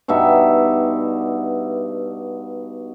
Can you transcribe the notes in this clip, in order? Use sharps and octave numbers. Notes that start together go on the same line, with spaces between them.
G2 B2 D#4 E5